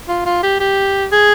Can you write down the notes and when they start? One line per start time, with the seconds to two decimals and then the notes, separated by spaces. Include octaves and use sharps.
0.08 F4
0.26 F4
0.43 G4
0.60 G4
1.12 G#4